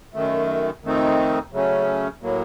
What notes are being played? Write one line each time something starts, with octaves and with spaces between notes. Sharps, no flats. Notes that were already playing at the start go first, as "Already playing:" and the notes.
F#2 D#3 A3
F2 D#3 A3 C4 D#4
C#3 F#3 A3 C#4
A2 F#3 A#3